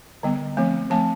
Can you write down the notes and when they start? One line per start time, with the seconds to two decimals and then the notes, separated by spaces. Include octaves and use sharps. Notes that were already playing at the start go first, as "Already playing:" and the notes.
0.23 D3 G3 B3
0.57 F3 A3 C4
0.90 F3 A3 C4 A5